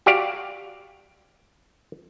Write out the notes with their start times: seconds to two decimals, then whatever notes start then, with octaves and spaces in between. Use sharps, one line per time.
0.06 F#4 G4 D5 F5